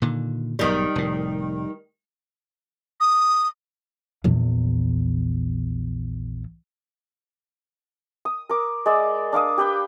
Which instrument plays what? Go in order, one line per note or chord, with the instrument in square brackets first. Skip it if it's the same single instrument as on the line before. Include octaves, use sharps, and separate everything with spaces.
[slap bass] A#2 D3 D#3
[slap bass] B1 G#2 [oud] D#3 G3
[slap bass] F1 A2
[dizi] D#6
[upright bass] A#1 E2
[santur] D#6
A#4 D6
G#3 D5 E5
D4 F5 D6 D#6
G4 B4 G5